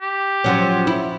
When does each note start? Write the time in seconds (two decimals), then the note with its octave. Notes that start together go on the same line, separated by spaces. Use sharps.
0.02 G4
0.44 F3 F#3 C#4
0.87 E4